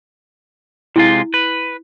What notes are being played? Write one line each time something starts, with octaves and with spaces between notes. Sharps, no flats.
C3 G#3 E4 F4
B4